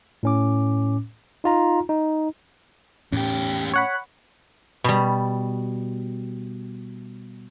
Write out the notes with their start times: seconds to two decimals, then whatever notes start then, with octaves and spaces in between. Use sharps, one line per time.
0.23 A2 C#4 D6
1.44 D#4 F4 A#5
1.89 D#4
3.12 E2 A2 C#4 G4
3.73 C#5 F#5 B5
4.84 B2 G3